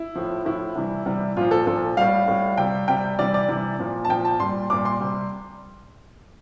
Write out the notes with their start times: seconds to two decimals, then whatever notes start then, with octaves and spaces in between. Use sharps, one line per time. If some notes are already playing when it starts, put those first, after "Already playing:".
Already playing: E4
0.15 A2 F3
0.45 A2 F3 E4
0.75 C3 E3 G3
1.06 C3 E3 G3
1.37 A#2 F3 F4
1.51 A4
1.67 A#2 F3 A4
1.97 A2 G3 F5
2.28 A2 G3
2.57 C3 G3 G5
2.88 C3 G3 G5
3.19 C3 E3 G3 D5
3.34 D5
3.48 C3 E3 G3
3.79 A#2 F3
4.05 A5
4.09 A#2 F3 G5
4.25 A5
4.40 A#2 G3 C6
4.70 A#2 G3 D6
4.85 C6
5.01 C3 G3